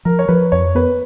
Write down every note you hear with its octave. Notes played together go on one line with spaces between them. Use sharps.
F3 A#4
C#5
F3 B4
F2 C#5
B3 B4